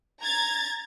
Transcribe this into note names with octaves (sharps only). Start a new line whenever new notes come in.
A#5 G#6 A6